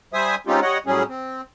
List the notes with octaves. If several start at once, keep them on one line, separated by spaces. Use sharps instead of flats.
G3 C5 E5 G#5 D#6
G#3 C4 C#4 D#4 F4 G4
G3 C#5 D#5 F#5
A2 F#3 G3 C#4 G#4
C4